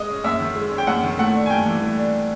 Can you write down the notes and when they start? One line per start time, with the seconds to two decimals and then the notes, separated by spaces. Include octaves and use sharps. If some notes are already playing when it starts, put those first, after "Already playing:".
Already playing: G#3 D#5
0.10 C#4
0.24 F#2 E5
0.40 D#3
0.56 G#3
0.72 C#4
0.78 G5
0.87 F#2 F#5
1.03 D#3
1.18 A3 F#5
1.34 D4
1.46 G#5
1.50 G2 G5
1.66 E3
1.81 A3
1.97 D4